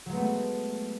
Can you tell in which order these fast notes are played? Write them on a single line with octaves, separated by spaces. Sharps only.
F#3 G#3 B3 A3